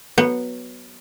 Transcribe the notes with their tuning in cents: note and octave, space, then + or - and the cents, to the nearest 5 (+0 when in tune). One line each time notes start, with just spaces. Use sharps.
F#3 +0 B3 -10